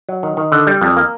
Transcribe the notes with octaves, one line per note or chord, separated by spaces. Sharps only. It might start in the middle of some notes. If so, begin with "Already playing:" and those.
F#3
D#3
D#3
D3
G3
F2
A#3